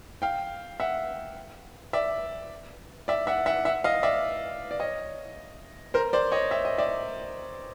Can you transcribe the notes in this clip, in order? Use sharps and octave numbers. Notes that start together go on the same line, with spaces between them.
F5 G5
E5 F#5
D5 E5
D5 E5
E5 F#5
E5 F#5
E5 F#5
D#5 F5
D5 E5
D5
C#5 D#5
A#4 C5
C5 D5
C#5 D#5
E5
D#5
D5 E5